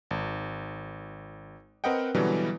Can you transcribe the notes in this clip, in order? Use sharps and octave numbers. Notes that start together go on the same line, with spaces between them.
G#1
C4 A#4 B4 D#5 F#5 G5
B2 D3 E3 F#3 G3